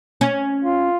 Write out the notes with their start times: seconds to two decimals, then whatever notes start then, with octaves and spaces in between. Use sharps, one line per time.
0.21 C#4
0.64 F4